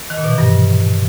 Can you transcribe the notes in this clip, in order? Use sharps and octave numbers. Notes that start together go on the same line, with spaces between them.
D#3
A#2
B2
E3
G2